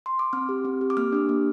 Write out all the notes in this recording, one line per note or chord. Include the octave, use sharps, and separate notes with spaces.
C6
D6
C4 F6
G4
C4
G4
D6
A#3 F6
D4 G4
A#3